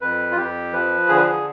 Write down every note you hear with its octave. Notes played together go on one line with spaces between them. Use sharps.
F2 B4
F4
F2 G4
F3 B4
D3 G#4
B4
G#4